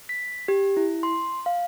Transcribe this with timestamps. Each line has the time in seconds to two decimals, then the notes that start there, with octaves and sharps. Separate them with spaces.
0.09 B6
0.48 G4
0.77 E4
1.03 C6
1.46 F5